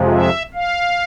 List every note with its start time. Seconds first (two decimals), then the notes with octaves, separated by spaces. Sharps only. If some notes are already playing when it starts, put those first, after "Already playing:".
Already playing: F2 C3 F3 G#3
0.13 E5
0.54 F5